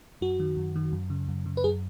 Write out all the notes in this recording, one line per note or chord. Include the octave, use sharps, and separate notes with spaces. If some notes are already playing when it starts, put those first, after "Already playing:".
F#2 F#4
D#3
F#2
D#3
F#2
C#3
F#2
C#3
B4
F#2 G#4